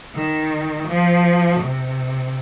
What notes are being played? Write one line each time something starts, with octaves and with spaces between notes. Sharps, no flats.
D#3
F3
C3